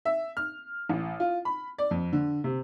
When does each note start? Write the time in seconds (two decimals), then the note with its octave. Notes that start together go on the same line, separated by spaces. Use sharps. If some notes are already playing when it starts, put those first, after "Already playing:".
0.05 E5
0.37 F6
0.89 A1
1.20 F4
1.45 B5
1.78 D5
1.91 F2
2.13 D3
2.44 C3